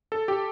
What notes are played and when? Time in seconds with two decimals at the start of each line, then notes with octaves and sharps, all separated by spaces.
0.12 A4
0.28 G4